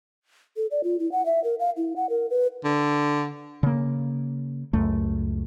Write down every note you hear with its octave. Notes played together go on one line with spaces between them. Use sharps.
A4
D5
F4
E4
F#5
E5
A#4
F5
E4
F#5
A#4
B4
D3
C#3 A#3
C#2 F#2 A3